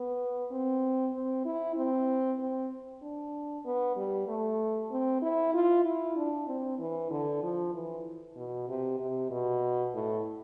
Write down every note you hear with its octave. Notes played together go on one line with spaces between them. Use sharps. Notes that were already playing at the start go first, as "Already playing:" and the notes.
Already playing: B3
C4
C4
E4
C4
C4
D4
B3
G3
A3
C4
E4
F4
E4
D4
C4
E3
D3
F3
E3
B2
C3
C3
B2
A2